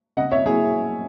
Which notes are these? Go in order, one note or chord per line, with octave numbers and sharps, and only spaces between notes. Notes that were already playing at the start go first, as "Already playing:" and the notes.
C#3 D#5 F#5
C#5 E5
F#3 A#3 E4 G#4